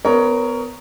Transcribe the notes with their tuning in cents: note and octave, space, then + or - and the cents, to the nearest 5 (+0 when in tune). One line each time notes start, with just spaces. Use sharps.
B3 +25 A#4 +0 C#5 +15